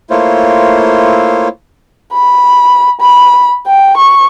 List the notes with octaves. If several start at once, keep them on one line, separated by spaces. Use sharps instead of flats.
A3 A#3 E4 F4 C5 C#5
B5
B5
G5
C#6